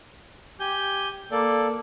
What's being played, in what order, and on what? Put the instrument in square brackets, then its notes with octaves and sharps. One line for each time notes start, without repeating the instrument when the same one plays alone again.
[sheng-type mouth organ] G4 G#5 G6
A#3 A4 D5